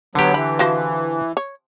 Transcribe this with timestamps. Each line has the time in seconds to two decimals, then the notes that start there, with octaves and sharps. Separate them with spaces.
0.15 D3 F#3 B3 G4
0.34 E3 B5
0.59 F3 F#4 C5
1.37 C#5